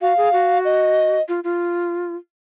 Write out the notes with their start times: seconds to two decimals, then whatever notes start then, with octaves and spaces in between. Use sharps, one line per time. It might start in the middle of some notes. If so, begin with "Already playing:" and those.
0.01 F#4 F5
0.17 G#4
0.33 F#4
0.65 D#5
1.28 F4
1.44 F4